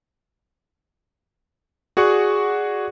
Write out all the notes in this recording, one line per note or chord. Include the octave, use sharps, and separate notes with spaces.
F#4 G#4 D5 F#5 C#6